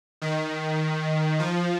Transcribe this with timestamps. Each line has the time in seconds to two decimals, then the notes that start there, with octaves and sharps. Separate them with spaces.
0.22 D#3
1.39 F3